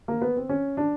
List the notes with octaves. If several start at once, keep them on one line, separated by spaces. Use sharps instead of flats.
A#3
B3
C4
C#4
D4